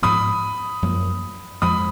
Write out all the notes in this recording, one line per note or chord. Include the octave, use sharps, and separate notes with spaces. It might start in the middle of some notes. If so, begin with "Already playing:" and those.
G#2 F3 B3 B5 D#6
F#2 F3 A#3
F2 F3 G#3 B5 D#6